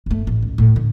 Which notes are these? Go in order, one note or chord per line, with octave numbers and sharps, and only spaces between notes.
G1 A3
A1
C#2
A2 A3
D3